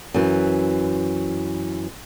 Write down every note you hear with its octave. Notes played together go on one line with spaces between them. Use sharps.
F#2 E3